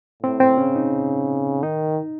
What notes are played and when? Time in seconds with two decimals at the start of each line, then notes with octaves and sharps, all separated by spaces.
0.23 A2 C4
0.40 C4
0.58 C#3 C#4
0.76 D#4
1.63 D#3 D#4